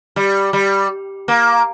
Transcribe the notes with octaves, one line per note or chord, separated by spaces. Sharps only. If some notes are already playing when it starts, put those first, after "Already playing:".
G3
G3
A#3